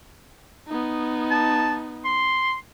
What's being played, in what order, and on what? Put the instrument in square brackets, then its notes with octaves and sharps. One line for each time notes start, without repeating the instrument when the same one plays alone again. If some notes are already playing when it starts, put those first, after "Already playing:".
[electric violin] B3 D#4
[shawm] A5
C6